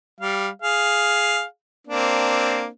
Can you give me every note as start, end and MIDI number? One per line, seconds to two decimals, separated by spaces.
0.21 0.49 55
0.21 0.49 77
0.62 1.44 68
0.62 1.44 77
1.87 2.67 58
1.87 2.67 60
1.87 2.67 62